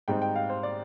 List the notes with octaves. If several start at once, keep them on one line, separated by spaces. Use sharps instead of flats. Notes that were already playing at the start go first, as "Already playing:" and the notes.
G#2 G3 C4 D#4 G5
G5
F5
C5
D5